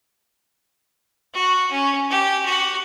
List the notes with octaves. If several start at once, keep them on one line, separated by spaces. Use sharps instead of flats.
F#4
C#4
G4
F#4